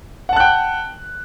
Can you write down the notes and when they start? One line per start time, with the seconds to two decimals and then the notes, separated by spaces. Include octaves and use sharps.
0.29 F#5
0.33 A5
0.36 F#6
0.40 G5